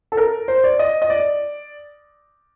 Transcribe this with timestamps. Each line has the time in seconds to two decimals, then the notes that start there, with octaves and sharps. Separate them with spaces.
0.12 A4
0.17 A#4
0.48 C5
0.64 D5
0.79 D#5
1.02 D#5
1.10 D5